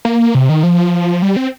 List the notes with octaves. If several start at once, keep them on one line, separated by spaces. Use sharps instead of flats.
A#3
C3
D#3
F3
G3
C4